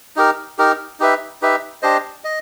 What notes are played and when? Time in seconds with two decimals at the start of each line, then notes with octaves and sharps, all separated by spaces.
0.16 D#4 G4 A#4
0.58 D#4 G4 A#4
1.00 D#4 G4 B4 E5
1.42 D#4 G4 B4 E5
1.82 D4 G4 C5 D#5
2.24 D#5